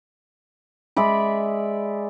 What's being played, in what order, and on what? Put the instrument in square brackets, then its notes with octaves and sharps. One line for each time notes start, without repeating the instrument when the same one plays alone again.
[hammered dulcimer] G#3 D5 E5 B5